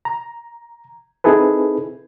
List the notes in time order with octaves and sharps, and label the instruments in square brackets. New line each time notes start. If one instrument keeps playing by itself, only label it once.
[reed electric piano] A#5
C4 D#4 E4 G#4 A4 B4